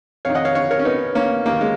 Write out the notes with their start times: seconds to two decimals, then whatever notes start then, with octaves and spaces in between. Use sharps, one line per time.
0.25 F2 D#3 C#5 F5
0.35 D#5 F#5
0.45 C#5 F5
0.55 C#5 F5
0.71 A#4 C#5
0.79 C#4
0.85 B3 D#4
1.15 A#3 C#4
1.46 D#2 D#3 A#3
1.61 G#3